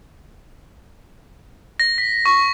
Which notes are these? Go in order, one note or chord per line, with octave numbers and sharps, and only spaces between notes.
A#6
B6
C#6